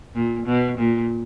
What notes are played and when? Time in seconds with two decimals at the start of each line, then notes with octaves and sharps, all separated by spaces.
0.14 A#2
0.46 B2
0.78 A#2